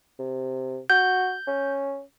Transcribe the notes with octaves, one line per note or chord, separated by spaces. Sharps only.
C3
F#4 G6
C#4